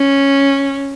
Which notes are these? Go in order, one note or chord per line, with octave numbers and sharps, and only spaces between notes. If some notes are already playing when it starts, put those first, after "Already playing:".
Already playing: C#4